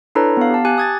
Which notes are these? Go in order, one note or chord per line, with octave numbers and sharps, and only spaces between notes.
D4 E4 A4 B4 C#5 A#5
B3 F5
G4 A5
G4 G#5 F#6
D#6 G#6 A6